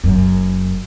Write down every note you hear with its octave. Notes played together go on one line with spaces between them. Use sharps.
F#1 F#2